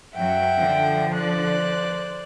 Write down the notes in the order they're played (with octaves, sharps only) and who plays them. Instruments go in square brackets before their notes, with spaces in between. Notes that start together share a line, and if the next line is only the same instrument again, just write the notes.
[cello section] F#2 F#3 [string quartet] E5 F#5 G5
[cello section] D3 F3
[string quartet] C5 D5 F#6